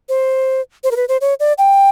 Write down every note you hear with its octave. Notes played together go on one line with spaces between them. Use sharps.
C5
C5
A#4
B4
C5
C#5
D5
G5